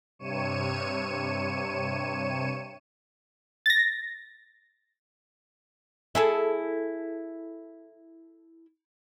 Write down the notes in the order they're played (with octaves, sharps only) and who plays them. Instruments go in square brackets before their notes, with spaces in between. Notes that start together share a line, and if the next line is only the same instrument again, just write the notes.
[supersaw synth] G2 C3 C#5 C#7 D#7 E7
[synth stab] A6 A#6
[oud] E4 G#4 A4